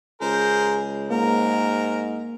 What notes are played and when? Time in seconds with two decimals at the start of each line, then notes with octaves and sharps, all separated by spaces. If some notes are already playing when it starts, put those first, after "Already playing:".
0.21 C#2 G#4 A#4 C5
1.10 G#2 A#3 A#4